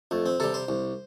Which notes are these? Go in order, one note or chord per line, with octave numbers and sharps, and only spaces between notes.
F2 A3
C4
C3 G3 A4
C5
C2